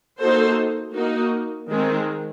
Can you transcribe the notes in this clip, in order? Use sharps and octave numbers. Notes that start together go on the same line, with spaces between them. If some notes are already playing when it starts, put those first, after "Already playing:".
A#3 D#4 F#4 A4 C5
A#3 D#4 F#4
D#3 G#3 C4